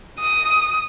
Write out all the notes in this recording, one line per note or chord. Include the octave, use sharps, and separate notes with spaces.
D#6